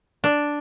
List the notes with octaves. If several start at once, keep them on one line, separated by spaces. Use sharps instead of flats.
D4